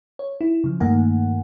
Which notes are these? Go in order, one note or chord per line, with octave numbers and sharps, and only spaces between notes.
C#5
E4
C#3 F3
G2 D#3 A3 A#3 F#5 G#5